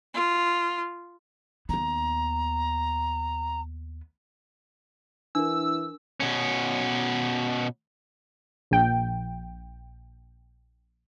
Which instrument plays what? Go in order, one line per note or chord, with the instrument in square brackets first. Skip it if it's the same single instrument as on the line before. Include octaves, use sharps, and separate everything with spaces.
[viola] F4
[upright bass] D#2 B3 [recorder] A#5
[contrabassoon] E3 [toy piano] D4 A#4 [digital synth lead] E6
[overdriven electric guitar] B2 C#4
[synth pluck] A#1 G5